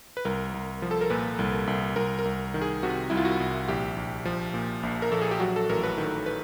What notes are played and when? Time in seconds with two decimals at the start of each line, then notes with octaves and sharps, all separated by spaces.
0.17 B4
0.25 C2 A#4
0.54 C2
0.82 F3
0.91 A4
1.01 A#4
1.10 A#2 B4
1.39 C2
1.67 C2
1.96 C2 A#4
2.19 A#4
2.25 C2
2.54 D#3
2.62 G#4
2.83 C3 F#4
3.10 C2 E4
3.17 F4
3.25 F#4
3.40 C2
3.68 A#1 G4
3.96 A#1
4.25 F3
4.54 A#2
4.83 A#1
5.02 A#4
5.12 A#1 A4
5.22 G#4
5.31 G4
5.40 F#3 F#4
5.56 A4
5.69 A1 A#4
5.83 B4
5.98 D#3
6.26 B4